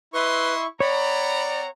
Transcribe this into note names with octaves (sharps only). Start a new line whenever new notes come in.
E4 B4 D#5 E5 C6 C#6
C4 C#5 D5 F#5 A#5 B5